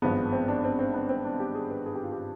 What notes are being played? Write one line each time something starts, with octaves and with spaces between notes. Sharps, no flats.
G#1 G2 F3 G#3 B3
C4
D4
C4
C4
B3
C4
D4
G4
G#4
B4
G#4
G4
F4
G4